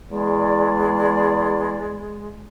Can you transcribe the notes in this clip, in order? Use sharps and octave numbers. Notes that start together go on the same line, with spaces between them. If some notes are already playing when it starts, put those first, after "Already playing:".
E2 G#3 D5